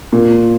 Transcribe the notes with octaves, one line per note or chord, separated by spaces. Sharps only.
A#2